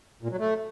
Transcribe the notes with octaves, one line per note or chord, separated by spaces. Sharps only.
A#2
F#3
A3